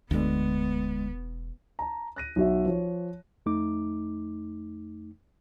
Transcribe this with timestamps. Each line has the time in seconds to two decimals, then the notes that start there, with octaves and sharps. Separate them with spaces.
0.11 E1 D2 D3 G#3 B3
1.79 A5 A#5
2.16 F#6 A#6 D#7
2.36 B1 F#4 E5
2.66 F3 C#5
3.46 F2 A3 D#4 D6